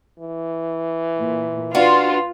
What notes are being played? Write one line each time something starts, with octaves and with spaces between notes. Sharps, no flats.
E3
A#2
D4 F4 F#4 B4